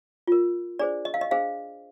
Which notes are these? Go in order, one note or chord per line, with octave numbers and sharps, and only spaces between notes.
F4 A#4
D4 G#4 C5 D5
D#5
F5
D#5
D4 G#4 C5 F5